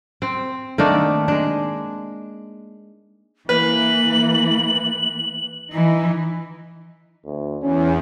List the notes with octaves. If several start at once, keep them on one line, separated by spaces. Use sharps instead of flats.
C4
D#3 A3 A#3 D4
G#3 D4
E3 A#3 B4 F#7
E3 D#4
D2
E2 C#4